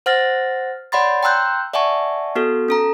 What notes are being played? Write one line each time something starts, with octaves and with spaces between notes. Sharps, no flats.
C5 F#5 F6 A6 A#6
C#5 D5 F#5 B5 C6 A6
G5 A#5 C6 E6 F#6 G6
D5 E5 F#5 G#5 A5 C#6
B3 F#4 A4
C#4 A4 A#5